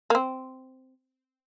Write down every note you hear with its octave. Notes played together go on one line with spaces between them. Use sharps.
A#3
C4